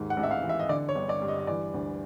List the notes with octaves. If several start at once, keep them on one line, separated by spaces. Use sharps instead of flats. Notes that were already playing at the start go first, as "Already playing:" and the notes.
Already playing: D#2 G#2
F#5
A1
E5
F5
E3
E5
D#5
D3 D5
C#5
G1
D5
G2
D#5
D#5
E3 D5
D2